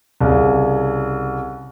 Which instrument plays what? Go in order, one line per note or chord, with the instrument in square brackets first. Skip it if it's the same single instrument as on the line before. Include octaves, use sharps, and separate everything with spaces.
[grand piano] C2 C#3